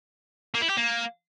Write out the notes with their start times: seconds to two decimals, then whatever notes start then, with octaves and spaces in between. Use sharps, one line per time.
0.54 A#3
0.62 E4
0.69 G4
0.77 A#3